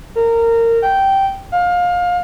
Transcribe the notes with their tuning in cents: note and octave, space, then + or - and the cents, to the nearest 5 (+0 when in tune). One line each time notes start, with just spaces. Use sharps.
A#4 -20
G5 -10
F5 +25